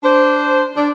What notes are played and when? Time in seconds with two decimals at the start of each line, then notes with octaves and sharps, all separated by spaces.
0.04 D4 C5
0.76 D4